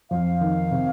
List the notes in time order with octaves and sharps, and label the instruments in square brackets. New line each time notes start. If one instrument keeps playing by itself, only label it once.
[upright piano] F2 [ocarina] F5
[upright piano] D#3
C3